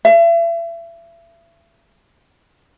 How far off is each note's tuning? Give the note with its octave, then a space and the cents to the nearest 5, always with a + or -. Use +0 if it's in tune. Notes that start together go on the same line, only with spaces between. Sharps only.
E5 +35